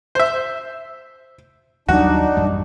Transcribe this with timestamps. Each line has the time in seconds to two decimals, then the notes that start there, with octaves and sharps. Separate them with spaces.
0.15 C5 E5
1.89 D#2 F#3 G3 D4 D#4 F#4
2.37 A1 F#2 G3